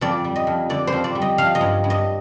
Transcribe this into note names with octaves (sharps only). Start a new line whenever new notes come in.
F2 D5
G3
D#5
F2
D3 D5
C5
F2
D5
G3
D#5
F3 F5
D#5
G2
G2
D#5